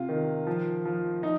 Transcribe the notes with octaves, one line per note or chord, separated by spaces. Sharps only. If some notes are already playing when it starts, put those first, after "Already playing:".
Already playing: C3 F4
D#3
F3
F3
F3 D#4